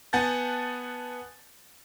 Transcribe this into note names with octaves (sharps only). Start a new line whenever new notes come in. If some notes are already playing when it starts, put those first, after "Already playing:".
B3 F#5 G#5 A5 G6 A6